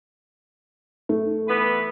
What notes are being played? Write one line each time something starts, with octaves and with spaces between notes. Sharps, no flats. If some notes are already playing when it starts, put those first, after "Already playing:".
A3
E3 B3 B4